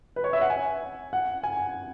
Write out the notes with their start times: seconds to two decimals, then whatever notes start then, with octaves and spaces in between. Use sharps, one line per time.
0.16 B4
0.24 C#5
0.33 E5
0.41 F#5
0.50 G#5
1.13 F#5
1.44 G#5